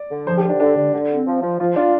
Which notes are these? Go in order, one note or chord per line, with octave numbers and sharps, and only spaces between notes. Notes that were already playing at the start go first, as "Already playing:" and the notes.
Already playing: D5
D3
F3 C5
G4
D3
D4
D3 D4
D3
D3
C4
F3
F3
F3 F4
D4 F4